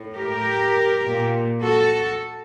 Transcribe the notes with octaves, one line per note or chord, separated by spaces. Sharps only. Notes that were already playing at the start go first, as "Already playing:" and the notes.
Already playing: A2
G4 A#4
A#2
F#4 A4